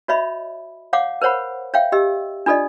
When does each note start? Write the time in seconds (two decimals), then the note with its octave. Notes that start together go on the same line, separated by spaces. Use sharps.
0.08 F#4 C#5 D#5 E5 B5
0.93 C#5 F5 F#5 D6
1.22 A#4 C5 C#5 F#5 B5
1.74 C#5 E5 F5 G5
1.92 G4 D#5 E6
2.46 D4 F4 A4 D5 D#5